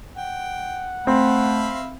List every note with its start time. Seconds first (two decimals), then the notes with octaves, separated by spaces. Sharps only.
0.17 F#5 G5
1.07 A3 C4 E5 F5 B5